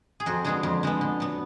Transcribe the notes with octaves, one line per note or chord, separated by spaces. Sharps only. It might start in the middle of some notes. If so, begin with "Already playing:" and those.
G#4
F2 F#4
D3 G#3 B3 G#4
F2
D3 G#3 B3
D3
F#3 B3